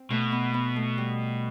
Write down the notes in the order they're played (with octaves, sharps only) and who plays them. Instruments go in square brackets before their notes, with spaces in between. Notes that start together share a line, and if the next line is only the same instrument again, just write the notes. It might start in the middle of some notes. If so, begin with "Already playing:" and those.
Already playing: [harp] C4
[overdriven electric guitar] B2 [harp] A3
[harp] B3
B3
A3
G3